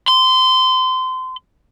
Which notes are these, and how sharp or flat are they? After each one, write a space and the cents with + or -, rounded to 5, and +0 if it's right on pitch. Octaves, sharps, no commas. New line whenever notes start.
C6 -25